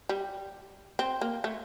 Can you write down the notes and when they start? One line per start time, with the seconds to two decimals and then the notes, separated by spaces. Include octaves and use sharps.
0.09 G3
0.99 C4
1.21 A#3
1.44 A3